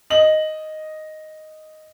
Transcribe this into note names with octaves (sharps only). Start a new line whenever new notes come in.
D#5 F#7